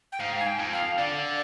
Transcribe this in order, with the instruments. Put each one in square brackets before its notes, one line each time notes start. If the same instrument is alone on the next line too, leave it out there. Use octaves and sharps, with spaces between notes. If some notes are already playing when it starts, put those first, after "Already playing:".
[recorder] G5
[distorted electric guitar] G#2 [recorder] F5
[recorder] G#5
G5
[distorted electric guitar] F2
[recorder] F5
[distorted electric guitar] D3 [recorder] D5